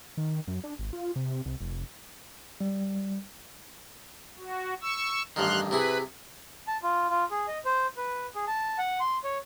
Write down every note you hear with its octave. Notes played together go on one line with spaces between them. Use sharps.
D#3
F#2
D4
G#1
F4
C3
C2
F1
G3
F#4
C#6 E6
A1 G2 D#3 C6 F6 F#6
C3 E4 G#4 B4 B5
A5
F4
F4
G#4
D#5
C5
B4
G#4
A5
F#5
C6
C#5